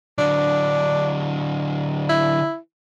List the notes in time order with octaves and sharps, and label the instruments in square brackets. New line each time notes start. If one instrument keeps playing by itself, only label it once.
[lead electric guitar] D3 F#3 [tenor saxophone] D4
[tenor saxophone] E4